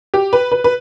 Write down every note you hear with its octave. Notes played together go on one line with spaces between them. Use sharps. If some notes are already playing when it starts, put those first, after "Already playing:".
G4
B4
B4
B4